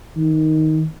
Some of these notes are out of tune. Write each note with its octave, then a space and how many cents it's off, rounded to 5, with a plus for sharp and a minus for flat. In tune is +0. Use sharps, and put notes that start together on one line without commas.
D#3 +10